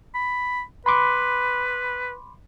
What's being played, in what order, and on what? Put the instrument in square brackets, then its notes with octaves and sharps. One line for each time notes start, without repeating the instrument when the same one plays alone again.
[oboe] B5
[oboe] B4 [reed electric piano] B5 C6 D6